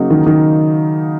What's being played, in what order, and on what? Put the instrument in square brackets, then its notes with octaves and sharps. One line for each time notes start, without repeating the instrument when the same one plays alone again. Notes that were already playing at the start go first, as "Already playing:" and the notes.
Already playing: [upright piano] C#3 F#3 A#3 D#4
[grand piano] D#3
D#3